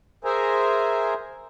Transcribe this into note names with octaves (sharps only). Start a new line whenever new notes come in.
G#4 A#4 C5 E5 G#5 A#5